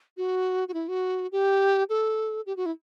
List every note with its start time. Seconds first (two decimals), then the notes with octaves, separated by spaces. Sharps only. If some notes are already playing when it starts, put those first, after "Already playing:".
0.17 F#4
0.68 F#4
0.74 E4
0.88 F#4
1.32 G4
1.89 A4
2.46 G4
2.57 F#4
2.66 E4